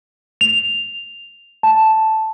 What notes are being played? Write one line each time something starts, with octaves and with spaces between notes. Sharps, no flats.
F7
A5